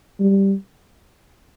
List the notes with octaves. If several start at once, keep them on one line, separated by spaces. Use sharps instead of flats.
G3